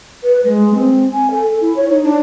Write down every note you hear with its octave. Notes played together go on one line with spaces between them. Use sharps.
B4
G#3
C4
G#5
A4
E4
C#5
D#4
D4